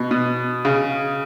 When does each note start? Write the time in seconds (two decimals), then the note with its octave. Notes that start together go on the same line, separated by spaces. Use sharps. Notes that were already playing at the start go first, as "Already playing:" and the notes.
Already playing: B2
0.11 B2
0.65 C#3